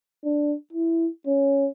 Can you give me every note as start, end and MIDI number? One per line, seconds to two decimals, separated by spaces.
0.24 0.55 62
0.73 1.07 64
1.27 1.69 61